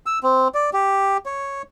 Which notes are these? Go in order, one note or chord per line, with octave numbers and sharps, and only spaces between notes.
E6
C4
D5
G4
C#5